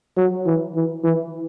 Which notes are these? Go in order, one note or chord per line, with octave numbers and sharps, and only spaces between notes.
F#3
E3
E3
E3